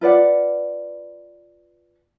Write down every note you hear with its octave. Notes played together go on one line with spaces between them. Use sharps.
F4 B4 D5 F#5